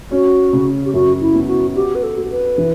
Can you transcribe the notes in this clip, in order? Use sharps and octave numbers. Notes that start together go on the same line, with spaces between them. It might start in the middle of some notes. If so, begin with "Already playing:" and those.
C#4 F#4
C#3
G4
F#2 F#4
E4
B3
F#4
F#4 G4
B4
A4
F#4
B4
E3